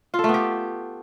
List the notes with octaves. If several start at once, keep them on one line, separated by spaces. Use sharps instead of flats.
F4
A4
A3
B3
G4